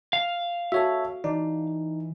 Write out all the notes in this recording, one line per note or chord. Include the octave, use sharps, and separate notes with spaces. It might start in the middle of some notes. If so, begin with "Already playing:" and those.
F5
F#4 A4 C#5 E5
E3 D#4 D5